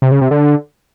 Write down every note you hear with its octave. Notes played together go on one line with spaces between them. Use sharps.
C3
C#3
C3
D3